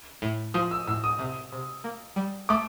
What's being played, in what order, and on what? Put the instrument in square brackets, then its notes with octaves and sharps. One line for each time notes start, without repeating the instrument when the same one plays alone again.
[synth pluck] A2
[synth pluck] F3 [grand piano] D#6
[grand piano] E6
[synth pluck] A2 [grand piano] E6
[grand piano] D#6
[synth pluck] C3
C3
A#3
G3
[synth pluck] A3 [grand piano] D6